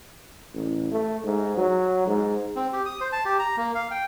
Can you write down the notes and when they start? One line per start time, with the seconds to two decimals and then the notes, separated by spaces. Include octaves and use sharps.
0.54 A1
0.92 A3
1.23 G#2
1.57 F#3
2.07 G#2
2.56 C4
2.73 G4
2.86 D#6
3.01 C5
3.12 A5
3.25 G4
3.39 A#5
3.57 A#3
3.75 F5
3.91 G5